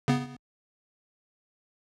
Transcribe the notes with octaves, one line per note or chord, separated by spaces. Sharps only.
C#3 B3